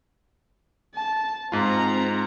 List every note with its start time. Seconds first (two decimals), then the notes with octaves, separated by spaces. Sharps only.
0.95 A5
1.52 G#2 C4 F4 A#5